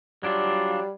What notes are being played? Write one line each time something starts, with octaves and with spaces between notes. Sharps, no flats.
F#3 G3 D4 F4